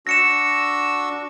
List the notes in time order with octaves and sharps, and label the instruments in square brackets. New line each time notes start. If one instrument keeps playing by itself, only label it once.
[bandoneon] D4 F#4 E6 [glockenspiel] A#6 C#7 E7